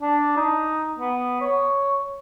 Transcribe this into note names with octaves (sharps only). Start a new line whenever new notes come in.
D4
D#4
B3
C#5